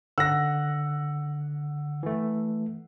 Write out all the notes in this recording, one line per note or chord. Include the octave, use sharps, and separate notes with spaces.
D3 F#5 E6 A#6
E3 A3